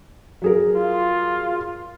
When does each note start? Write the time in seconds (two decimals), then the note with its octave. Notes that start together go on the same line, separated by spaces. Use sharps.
0.42 F#3 G#4 A#4
0.75 F4